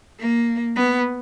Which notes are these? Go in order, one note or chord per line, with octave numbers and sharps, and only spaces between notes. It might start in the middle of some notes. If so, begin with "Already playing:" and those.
A#3
B3